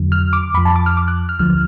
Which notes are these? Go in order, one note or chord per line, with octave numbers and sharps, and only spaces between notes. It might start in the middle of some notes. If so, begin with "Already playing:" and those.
Already playing: F2 D3 F#3
F6
D6
F2 F3 B5
A5
D6
F6
D6
F#6
F6
D2 D3 F3 F6